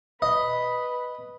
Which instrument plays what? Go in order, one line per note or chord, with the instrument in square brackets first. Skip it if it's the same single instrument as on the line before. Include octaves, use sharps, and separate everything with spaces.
[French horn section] B4 [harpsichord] D#5 [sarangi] B5